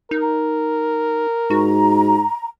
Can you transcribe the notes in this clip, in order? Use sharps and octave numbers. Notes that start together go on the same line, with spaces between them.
D#4 A#4
G#2 F#4 A#5